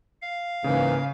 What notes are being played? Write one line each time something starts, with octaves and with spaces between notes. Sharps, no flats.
F5
G#2 C#3 E3 A#3